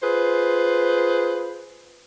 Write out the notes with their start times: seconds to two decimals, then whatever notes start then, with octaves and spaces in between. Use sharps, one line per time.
0.02 F4 G#4 B4 C5